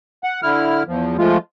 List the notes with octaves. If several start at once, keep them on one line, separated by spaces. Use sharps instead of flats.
F#5
D3 E4 F6
E2 F3
F3 G#3 A3 F4